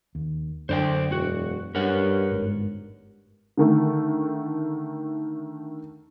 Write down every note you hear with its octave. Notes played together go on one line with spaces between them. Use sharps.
D#2
F#2 D3 C5 D5 G5
E1 F#4
G2 A#4 C#5 F#5
G1 G#2
D3 D#3 A3